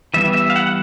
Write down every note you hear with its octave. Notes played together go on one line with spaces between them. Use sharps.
E3 G3 B3 E5
E5
F5
F#5